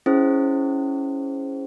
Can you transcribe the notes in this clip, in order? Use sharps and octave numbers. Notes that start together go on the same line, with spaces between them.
C#4 E4 G#4 C5